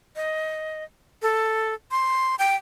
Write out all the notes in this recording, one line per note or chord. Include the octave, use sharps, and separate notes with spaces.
D#5
A4
C6
G5